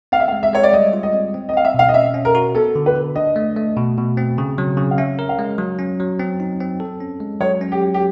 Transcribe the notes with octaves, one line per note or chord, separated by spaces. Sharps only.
C4 F5
E5
F5
G#3
E5
G#3 C#5
D5
G3 D#5
F4
D#5
C4
C4
D#5
C4 F5
E5
B2 F5
D#5
C#4 E5
C#4
A#4
F#4
B3 A4
D3
B4
D3
D4 D#5
A3
A3
B2
B2
C4
C#3
F#3
C#3
F5
C#4 E5
A#4
F5
G#3
F#3
C#4
F#3
C4
D#4
C4
A4
C#4
G#3
F#3 C#5
C#4
G4
F#3
G4